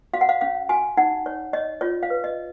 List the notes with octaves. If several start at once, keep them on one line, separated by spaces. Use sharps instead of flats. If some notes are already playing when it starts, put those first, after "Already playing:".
F#4 F5
F#5
F5
C#4 F5
F#4 G#5
D#4 F#5
C#5
C#5 D#5
F4 C#5
F5
B4
D#5